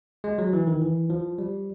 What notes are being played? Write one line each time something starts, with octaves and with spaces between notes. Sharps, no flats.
G#3
F#3
E3
D#3
E3
F3
G3